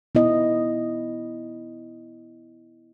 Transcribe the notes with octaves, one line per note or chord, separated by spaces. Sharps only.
B3 E4 D#5